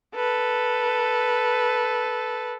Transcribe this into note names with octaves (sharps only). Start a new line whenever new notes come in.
A4 B4